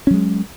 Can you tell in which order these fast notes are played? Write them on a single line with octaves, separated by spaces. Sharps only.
C#4 F#3 G#3